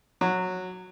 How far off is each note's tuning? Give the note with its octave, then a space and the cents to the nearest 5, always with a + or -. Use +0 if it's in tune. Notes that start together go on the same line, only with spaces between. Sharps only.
F#3 -10